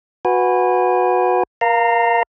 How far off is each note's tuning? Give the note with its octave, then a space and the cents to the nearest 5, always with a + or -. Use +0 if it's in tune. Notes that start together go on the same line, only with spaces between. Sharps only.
F#4 -15 B4 +0 G#5 -25
A#4 +25 F5 +0 A#5 -25